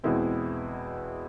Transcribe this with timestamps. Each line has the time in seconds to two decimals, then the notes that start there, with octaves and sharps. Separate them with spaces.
0.04 E2 B2 G#3 C4 E4